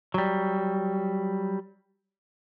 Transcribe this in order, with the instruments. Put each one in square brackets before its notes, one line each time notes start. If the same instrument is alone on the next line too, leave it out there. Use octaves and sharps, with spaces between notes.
[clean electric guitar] F#3 G3